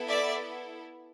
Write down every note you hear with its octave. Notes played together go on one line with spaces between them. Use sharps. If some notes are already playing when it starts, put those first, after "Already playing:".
Already playing: B3 E4 A4
D5 E5